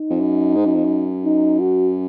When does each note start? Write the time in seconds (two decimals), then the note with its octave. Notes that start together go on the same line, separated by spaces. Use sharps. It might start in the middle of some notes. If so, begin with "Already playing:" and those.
Already playing: D#4
0.10 F2
0.20 F#2
0.55 G#2
0.65 F#2
0.74 F2
0.84 F#2
1.25 D#4
1.60 F#4